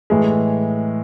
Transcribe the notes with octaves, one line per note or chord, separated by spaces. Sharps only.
A2 E3 G#3